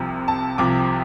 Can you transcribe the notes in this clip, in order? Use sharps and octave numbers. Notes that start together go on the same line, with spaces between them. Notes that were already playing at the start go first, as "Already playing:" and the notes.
Already playing: C2 C3 F3
A5
C2 C3 F3 D6